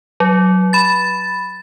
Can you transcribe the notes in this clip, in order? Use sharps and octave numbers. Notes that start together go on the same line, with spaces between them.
F#3
B5 A6